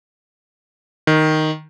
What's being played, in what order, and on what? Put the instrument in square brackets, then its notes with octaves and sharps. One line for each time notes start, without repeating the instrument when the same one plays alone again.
[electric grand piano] D#3